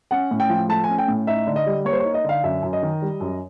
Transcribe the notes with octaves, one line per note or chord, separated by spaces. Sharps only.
C#4 F#5
A2
G5
F3
A3 A5
G#5
C#4
G5
A2
D#4 E5
D3
D#5
G3
A#3 C#5
C5
D#4 C#5
D#5
D3 F5
F#2 E5
F#2
D#5
D#3
G3
F#2